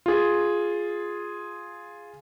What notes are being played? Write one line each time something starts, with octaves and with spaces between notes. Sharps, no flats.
F4 G#4